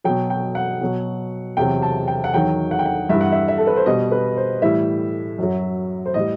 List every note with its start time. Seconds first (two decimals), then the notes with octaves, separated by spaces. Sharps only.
0.04 B2 F#3 G5
0.30 G5
0.55 F#5
0.81 B2 F#3
1.57 E2 C3 F#3 G5
1.82 A5
2.08 G5
2.24 F#5
2.34 E2 D#3 F#3 G5
2.71 F#5
2.79 G5
2.86 F#5
3.09 G2 E3 G3 E5
3.21 F#5
3.32 E5
3.48 E5
3.58 A4
3.67 B4
3.76 C5
3.86 B2 G3 D#5
4.11 B4
4.37 C5
4.62 A2 E3 G3 E5
5.38 F#2 F#3
6.06 C5
6.14 A2 G3 D#5